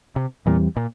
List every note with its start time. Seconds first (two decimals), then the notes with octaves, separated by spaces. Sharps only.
0.16 C3
0.46 E2 A#2 E3 G3 C4
0.76 A#2